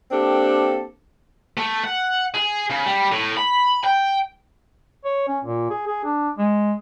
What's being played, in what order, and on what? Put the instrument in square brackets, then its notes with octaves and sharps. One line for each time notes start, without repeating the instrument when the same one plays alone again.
[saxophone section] A#3 C4 D4 G4 A4
[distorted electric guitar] A3
F#5
G#4
C#3
G3
A2
B5
G5
[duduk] C#5
C#4
A#2
G#4
G#4
D4
G#3